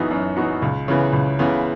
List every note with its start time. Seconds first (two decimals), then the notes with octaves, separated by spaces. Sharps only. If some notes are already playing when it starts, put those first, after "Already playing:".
Already playing: F#2 E3 B3 D#4 F#4
0.11 F#2
0.37 E3 B3 D#4 F#4
0.62 C#2
0.88 C#3 E3 B3
1.13 C#2
1.39 C#3 E3 B3